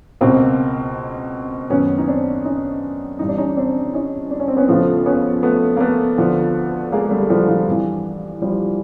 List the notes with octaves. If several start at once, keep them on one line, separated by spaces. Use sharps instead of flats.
C#2 B2 A#3 C4
F#2 D#3 B3 C#4
D#4
C4 D4
C#4 D#4
G2 E3 D#4
D4
C#4 D#4
C4 D4
C#4 D#4
D4
C#4
C4
B3 C#4
F2 C#3 F3 A3 B3
B3 C#4
A3 B3
A#3
A3 B3
D2 D3 F3
G#3 A#3
G3 A3
F3 G3
F3
G2 E3
F3 G3